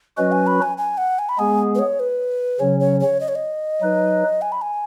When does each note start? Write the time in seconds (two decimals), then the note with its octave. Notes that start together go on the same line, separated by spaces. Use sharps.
0.17 F#3 C#4 F#4 B4 D#5
0.32 G#5
0.47 B5
0.62 G#5
0.78 G#5
0.98 F#5
1.19 G#5
1.29 B5
1.39 G#3 B3 G#4 G#5
1.75 B4
1.79 C#5
2.00 B4
2.59 C#3 F#3 C#4 C#5
2.80 C#5
3.00 C#5
3.20 D#5
3.28 C#5
3.35 D#5
3.81 F#3 D#4 B4
4.42 G#5
4.52 B5
4.62 G#5